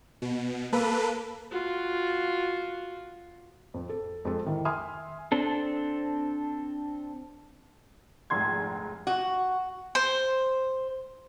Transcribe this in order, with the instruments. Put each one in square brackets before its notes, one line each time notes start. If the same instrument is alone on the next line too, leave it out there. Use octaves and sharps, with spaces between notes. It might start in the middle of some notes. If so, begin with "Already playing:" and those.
[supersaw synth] B2
A#3 A4 B4
[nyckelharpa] F4 F#4
[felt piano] F2
A4
F2 G#3 A4
D#3 E4
E5 G#5 C6 D#6 F6
[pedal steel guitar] C4 D4 A4
[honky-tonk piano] F1 A#1 G#2 C6 G#6
[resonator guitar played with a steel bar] F#4
[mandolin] C5